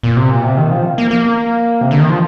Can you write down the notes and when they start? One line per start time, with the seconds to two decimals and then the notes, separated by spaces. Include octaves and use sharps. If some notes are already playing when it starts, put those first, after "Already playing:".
0.03 A#2
0.17 C3
0.31 A#2
0.43 C3
0.57 D#3
0.71 F3
0.98 A#3
1.11 A#3
1.81 C3
1.91 D3
2.00 D#3
2.09 F3